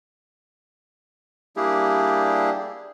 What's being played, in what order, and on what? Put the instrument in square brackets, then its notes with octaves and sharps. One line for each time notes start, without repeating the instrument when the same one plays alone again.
[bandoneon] G3 A#3 D4 E4 G4 G#4